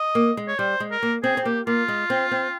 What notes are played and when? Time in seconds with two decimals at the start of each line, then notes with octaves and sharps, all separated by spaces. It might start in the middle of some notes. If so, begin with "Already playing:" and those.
Already playing: D#5
0.15 A#3
0.37 G#3
0.48 C#5
0.59 G3 C5
0.80 G#3
0.91 A#4
1.03 A#3
1.23 C4 G#4
1.37 C4
1.45 A#3 G4
1.66 A#3 F4
1.88 G#3
2.10 C4
2.31 C4